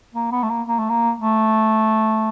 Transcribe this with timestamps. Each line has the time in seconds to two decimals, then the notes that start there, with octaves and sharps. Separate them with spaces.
0.15 A#3
0.32 B3
0.43 A3
0.50 A#3
0.67 A#3
0.79 A3
0.90 A#3
1.20 A3